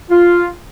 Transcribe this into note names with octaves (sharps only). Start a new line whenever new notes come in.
F4